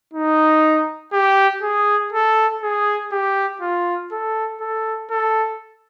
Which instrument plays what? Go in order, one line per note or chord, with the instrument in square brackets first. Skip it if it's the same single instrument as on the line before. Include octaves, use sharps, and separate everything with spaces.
[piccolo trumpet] D#4
G4
G#4
A4
G#4
G4
F4
A4
A4
A4